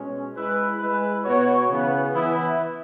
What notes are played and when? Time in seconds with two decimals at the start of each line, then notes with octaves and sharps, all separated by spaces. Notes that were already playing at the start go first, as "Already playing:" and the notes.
Already playing: B2 G#3 C#4
0.35 G#3 E4 B4
0.79 G#3 E4 B4
1.24 B2 B3 F#4 C#5
1.69 C#3 E3 B3
2.13 E3 B3 E4